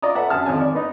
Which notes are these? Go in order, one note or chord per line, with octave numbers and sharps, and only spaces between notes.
F4 D5 D#5 A#5 D#6
A4 B4 E5 F#5
F#2 G#4 A5 F6
G#1 F2 C4 C#4 G#5 A5
D5
B3 D#4